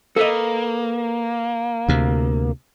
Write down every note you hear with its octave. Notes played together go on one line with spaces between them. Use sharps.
A#3 A4 B4 D#5
D2 C3